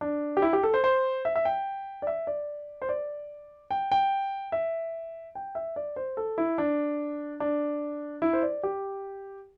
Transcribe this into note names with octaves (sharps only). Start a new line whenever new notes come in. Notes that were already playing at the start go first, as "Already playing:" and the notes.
D4
G4
E4
G4
A4
C5
C5
E5
E5
G5
D5
E5
D5
C5
D5
G5
G5
E5
G5
E5
D5
C5
A4
E4
D4
D4
E4
C5
D5
G4